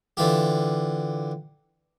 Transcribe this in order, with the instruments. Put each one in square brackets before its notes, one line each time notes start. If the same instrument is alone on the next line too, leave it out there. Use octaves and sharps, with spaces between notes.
[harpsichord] D3 E3 F4 G4